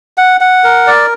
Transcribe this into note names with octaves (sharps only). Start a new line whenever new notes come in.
F#5
F#5
A#4
D5